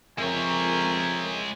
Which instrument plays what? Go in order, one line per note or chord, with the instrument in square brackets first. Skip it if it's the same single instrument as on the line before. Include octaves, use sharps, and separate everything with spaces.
[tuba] F2 [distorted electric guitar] G#3 C#5 [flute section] A#4 A#5 [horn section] E5 G5 G#5